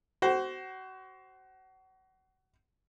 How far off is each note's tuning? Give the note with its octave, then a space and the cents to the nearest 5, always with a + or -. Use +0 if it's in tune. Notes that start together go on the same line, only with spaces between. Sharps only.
F#4 +30 C5 +0